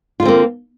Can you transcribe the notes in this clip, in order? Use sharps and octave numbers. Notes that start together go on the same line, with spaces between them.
D3 A#3 C4 F4